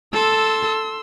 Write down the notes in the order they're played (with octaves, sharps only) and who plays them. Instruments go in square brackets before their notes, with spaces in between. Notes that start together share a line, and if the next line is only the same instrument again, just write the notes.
[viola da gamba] A4 [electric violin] C6 E6